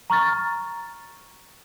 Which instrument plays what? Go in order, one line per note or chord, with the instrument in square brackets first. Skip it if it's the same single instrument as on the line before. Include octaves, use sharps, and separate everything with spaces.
[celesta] A#5 C#6 F6 A6